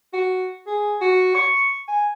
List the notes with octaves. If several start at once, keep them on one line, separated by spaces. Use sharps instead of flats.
F#4
G#4
F#4
C#6
G#5